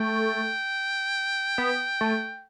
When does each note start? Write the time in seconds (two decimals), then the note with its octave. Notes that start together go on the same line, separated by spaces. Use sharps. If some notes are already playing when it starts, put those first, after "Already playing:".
Already playing: A3 G5
1.58 B3
2.01 A3